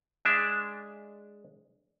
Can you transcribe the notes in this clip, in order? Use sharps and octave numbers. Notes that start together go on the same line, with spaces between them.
G#3 D4 E5